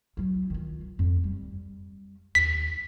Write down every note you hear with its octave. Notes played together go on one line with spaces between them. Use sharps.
F#3 E4
D#3 F4
F2
G3
D#2 B6